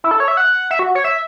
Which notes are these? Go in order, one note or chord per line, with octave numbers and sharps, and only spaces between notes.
E4
A4
C#5
E5
F#5
E5
F#4
C#5
E5